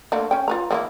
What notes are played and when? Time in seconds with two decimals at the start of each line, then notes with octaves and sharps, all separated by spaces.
0.12 D3 A3 A#3
0.31 C#4 G5
0.48 F4 B4 A#5
0.71 D#3 A#3 E4